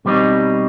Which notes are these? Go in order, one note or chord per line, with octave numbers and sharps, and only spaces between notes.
B2 G3 C4 D#4